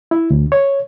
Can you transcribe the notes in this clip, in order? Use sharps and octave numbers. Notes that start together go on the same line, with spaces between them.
E4
D2
C#5